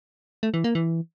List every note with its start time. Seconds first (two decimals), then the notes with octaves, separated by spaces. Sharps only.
0.43 A3
0.54 E3
0.64 A#3
0.75 E3